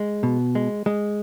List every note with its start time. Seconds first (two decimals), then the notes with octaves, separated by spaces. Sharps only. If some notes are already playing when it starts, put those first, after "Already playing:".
Already playing: G#3
0.23 B2
0.55 G#3
0.86 G#3